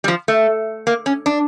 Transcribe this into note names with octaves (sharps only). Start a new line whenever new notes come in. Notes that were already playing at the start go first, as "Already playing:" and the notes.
G3
F3
A3
A#3
C#4
D4